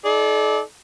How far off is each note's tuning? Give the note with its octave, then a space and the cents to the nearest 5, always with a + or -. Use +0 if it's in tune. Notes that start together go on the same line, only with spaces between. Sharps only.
D#4 +30 A4 -40 D5 +0